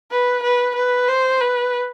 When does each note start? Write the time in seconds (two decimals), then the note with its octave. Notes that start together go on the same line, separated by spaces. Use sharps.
0.11 B4
0.44 B4
0.76 B4
1.08 C5
1.41 B4